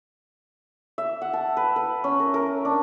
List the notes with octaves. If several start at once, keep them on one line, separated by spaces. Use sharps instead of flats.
E5
F#5
A5
B4
B4
C#4
A#4
A#4
D4